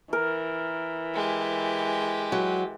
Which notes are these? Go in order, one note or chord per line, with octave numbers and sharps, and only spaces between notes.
E3 A#4
G#3 G4
F#3